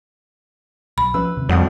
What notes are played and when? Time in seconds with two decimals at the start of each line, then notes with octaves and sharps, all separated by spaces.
0.98 B1 B5
1.14 F3 C#4 B4 E6
1.37 D#2 C3
1.49 G#1 F2 G3 F#5 D#6